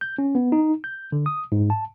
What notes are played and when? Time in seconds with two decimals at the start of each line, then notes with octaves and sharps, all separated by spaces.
0.01 G6
0.18 C#4
0.35 B3
0.52 D#4
0.84 G6
1.12 D3
1.26 D#6
1.52 G#2
1.70 A5